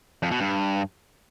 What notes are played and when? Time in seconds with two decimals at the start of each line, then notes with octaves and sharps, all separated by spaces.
0.23 F2
0.31 B2
0.40 G2